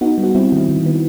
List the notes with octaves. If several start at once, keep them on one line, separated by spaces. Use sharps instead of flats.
B3 D#4 F#4
G3
F#4
G3 C4 E4
D#3
D#3
B3